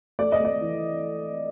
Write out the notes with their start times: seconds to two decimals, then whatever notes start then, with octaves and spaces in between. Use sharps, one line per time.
0.19 A3 D5
0.32 D#5
0.40 A3 D5
0.61 E3